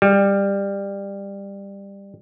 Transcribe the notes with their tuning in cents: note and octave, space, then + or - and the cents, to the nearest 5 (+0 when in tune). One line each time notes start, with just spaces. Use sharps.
G3 +20